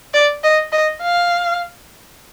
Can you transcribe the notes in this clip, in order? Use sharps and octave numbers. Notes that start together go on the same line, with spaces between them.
D5
D#5
D#5
F5